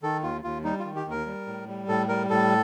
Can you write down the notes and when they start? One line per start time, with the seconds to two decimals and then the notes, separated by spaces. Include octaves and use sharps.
0.03 D#3 A4
0.23 D#2 F4
0.44 D#2 F4
0.64 G3 D#4
0.80 F4
0.85 D#3
0.96 G4
1.06 D#2 A#4
1.26 G3
1.47 A2
1.68 G3
1.88 A2 A4
2.08 G3 A#4
2.30 A2 A4